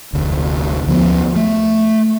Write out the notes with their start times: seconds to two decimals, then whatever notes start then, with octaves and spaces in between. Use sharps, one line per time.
0.13 F1 D2
0.87 D2 F3 A3 B3
1.36 A3